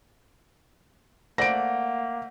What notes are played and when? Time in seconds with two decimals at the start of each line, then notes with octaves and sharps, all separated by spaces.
1.38 A3 A#3 C5 D5 F#5 A#6 D7